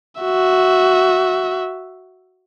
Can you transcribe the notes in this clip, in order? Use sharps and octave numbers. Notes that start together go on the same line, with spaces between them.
F#4 E5